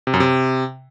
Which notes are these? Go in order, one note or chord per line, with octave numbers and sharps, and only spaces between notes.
C3
F#2
C3